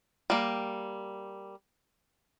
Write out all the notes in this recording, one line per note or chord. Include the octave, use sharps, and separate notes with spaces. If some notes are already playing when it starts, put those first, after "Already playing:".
G3 A#3